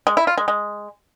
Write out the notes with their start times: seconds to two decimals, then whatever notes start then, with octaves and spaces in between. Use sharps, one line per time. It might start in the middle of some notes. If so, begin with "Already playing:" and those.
0.07 G#3
0.17 E4
0.27 F4
0.38 G#3
0.48 G#3